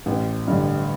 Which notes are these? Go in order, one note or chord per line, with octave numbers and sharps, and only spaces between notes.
A1
G2 D3